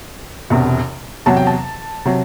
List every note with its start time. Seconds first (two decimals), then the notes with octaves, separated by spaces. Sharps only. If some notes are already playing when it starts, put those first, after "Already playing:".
0.50 E1 E2 C3
1.26 E2 C3 F#3 A5
1.36 G5
1.47 A5
2.05 C3 F#3